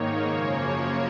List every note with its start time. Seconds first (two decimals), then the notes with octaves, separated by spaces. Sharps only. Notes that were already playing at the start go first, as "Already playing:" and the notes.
Already playing: G#2 D#3 A#3 D#4 C#5
0.26 F#2 C#3 F3 A#3